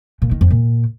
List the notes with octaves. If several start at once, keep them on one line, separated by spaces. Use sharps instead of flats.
A#2
D#3
F2
A#2